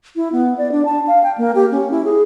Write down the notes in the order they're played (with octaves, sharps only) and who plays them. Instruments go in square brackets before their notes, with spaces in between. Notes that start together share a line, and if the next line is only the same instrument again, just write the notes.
[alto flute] E4
B3
D5
D4
A5
F5
G5
A#3
G4
C#4
E4
G#4